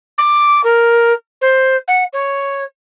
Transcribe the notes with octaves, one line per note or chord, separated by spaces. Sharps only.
D6
A#4
C5
F#5
C#5